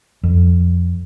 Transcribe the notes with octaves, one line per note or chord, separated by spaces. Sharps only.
F2